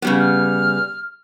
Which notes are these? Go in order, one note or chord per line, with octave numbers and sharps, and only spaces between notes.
C#3 G3 B3
F6